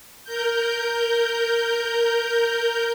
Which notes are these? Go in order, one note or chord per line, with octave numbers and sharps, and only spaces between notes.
A#4 G6